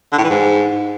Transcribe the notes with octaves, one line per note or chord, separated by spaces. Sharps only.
D3
A2
E3
G#2